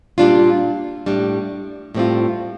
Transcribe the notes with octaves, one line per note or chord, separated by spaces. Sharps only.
A#2 G3 D4 F4
A2 G3 D4
A2 G3 C4 F4